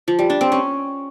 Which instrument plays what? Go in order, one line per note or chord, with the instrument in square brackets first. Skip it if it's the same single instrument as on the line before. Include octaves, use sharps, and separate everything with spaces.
[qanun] F3
G3
D4
C4
C#4